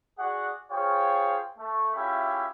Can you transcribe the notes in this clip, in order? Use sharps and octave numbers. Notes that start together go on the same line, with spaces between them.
F#4 G#4 D5 F#5
F4 G#4 C5 C#5 F5 G5
A3
C#4 E4 F4 G4 G#4 E5